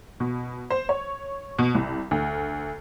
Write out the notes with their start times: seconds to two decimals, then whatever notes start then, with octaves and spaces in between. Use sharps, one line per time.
0.20 B2
0.70 C5
0.89 C#5
1.59 B2
1.75 C2
2.11 D2